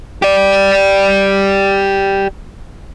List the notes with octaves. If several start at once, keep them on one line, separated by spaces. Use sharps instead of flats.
G4 D5